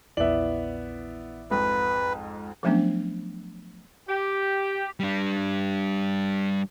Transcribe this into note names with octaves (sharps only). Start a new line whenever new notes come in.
A#1 E2 B3 E4 D5 E5 F#7
F2 G#2 B4
F3 F#3 A3 B3 C#4 D4
G4
G3 D4